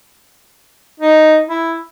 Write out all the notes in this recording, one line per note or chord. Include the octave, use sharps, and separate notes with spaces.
D#4
E4